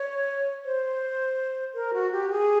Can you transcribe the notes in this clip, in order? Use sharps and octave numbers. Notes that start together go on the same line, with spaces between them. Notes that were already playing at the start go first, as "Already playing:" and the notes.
Already playing: C#5
C5
A#4
F#4
G4
G#4